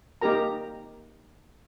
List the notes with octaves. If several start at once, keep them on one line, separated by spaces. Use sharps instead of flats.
A#3 D#4 G4 A#4 A#5